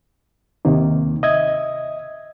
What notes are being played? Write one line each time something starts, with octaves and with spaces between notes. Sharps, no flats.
D#2 C3 D#3 A#3
D#5 E5 G#6